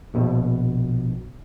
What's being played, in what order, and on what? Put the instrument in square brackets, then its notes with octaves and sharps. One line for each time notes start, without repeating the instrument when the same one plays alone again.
[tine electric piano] A#1 B2